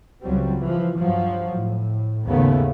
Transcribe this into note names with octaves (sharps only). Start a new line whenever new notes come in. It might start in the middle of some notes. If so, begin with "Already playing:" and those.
C#2 F#3 G3 C4
E3 F3
G2 F3 F#3
A2
D#2 G#2 C#3 A3 B3